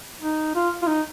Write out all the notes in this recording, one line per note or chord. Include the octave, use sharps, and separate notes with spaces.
D#4
F4
F4
D#4